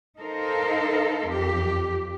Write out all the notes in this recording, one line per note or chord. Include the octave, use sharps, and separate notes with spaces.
D#4 A4 A#4 C5 F5
F2 G4